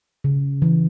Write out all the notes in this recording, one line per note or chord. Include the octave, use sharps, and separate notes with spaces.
C#3
E3